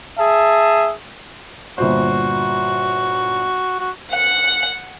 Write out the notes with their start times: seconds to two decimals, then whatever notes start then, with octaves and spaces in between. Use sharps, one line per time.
0.19 G#4 E5 A5
1.78 G1 A#2 F#4 C5
3.80 F#4
4.10 F#5